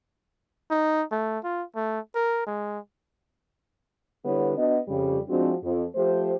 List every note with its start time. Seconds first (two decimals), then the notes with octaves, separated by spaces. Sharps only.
0.71 D#4
1.11 A3
1.44 F4
1.76 A3
2.15 A#4
2.47 G#3
4.24 D3 G3 B3 E4 B4 C#5
4.56 B3 D4 F#4 D#5
4.88 F2 C#3 G3
5.29 F3 G#3 C4 D4 F#4
5.63 F2
5.96 F3 A3 G4 C5